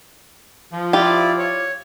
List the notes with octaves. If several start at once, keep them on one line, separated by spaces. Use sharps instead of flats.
F3
E4 F4 G4 D5
C#5